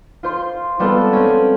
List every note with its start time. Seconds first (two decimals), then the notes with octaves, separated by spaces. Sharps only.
0.23 F4 C5 C6
0.79 G3 G#3 B3 C4 F4 A4
1.13 C4 C#4